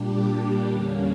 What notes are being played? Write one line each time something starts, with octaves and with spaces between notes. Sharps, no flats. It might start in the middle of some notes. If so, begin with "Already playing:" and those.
Already playing: A#2 G3 D4 G4
E2 D3 G3 A#3 C#4